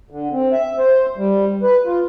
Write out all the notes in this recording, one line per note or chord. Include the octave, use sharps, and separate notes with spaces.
D3
C4
E5
C5
G3
B4
F4